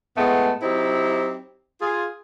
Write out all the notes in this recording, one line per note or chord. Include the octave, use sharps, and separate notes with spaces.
A2 G#3 A3 B3
F#3 C4 D#4 E4 G4
F4 G#4